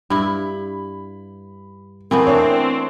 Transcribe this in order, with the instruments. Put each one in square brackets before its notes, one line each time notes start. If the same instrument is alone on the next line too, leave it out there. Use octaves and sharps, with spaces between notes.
[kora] G2 E4 [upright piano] B5
[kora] E3 A3 B3 [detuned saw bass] C4 [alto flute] A#4
[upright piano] D4 E4 C#5